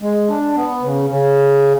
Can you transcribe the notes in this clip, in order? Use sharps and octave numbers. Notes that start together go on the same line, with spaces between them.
G#3
D4
B3
C#3
C#3